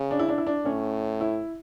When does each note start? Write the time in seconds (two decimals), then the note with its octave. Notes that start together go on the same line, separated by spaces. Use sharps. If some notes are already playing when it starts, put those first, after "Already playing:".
Already playing: C#3
0.11 D4
0.19 E4
0.29 D4
0.38 E4
0.47 D4
0.65 A2 C#4
1.21 E4